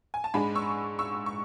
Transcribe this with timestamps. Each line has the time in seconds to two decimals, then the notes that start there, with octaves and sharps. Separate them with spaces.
0.14 G#5
0.24 A5
0.34 G#2 G#3 D4 G#5 B5
0.55 C#6 E6
0.99 C#6 E6
1.26 C#6